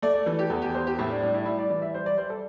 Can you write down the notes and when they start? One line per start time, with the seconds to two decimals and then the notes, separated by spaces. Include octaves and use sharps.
0.02 A3 D5
0.14 D5
0.26 E3 A4
0.39 G4
0.50 E2 A4
0.62 G4
0.74 E2 C5
0.87 G4
0.98 A2 E4
1.10 D4
1.22 G3 D4
1.34 E4
1.45 G3 E4
1.59 D5
1.70 E3 D5
1.82 E5
1.94 G3 C5
2.06 D5
2.17 G3 C5
2.30 A4